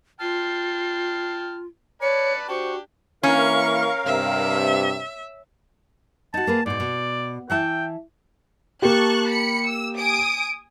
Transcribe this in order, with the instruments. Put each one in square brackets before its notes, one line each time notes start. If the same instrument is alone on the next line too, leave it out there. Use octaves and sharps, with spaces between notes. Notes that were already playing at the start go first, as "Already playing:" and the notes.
[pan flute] F4 [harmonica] G5 A5 F6 [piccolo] C7
[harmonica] B4 D5 A5 [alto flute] C#5 [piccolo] C#7
[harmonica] D4 G4 [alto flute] F#4 [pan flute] C5 [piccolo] C#6
[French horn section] E3 A#3 E4 [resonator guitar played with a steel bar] C#4 [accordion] A#4 F5 [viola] C#6
[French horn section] G2 C3 [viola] E5
[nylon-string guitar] D#4 F#4 [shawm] A5
[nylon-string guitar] A#3 G#4 B4
[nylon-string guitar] G#2 B2 [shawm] D5
[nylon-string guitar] B2
[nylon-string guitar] E3 E5 A5 [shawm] G5
[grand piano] A#3 G4 [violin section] A5 C#6 F#6
[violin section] B5 C#7
E6
G#5 D#6 D7